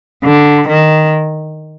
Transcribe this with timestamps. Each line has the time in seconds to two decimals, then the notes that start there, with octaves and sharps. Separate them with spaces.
0.24 D3
0.68 D#3